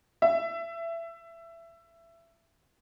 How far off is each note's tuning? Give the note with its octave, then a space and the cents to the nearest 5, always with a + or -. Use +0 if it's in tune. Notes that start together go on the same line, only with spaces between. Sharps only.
E5 +20